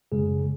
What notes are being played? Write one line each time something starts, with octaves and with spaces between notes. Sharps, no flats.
F#2 C#3 G#3 G#4